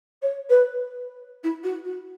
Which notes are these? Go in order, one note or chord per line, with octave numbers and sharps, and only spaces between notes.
C#5
B4
E4
F#4
F#4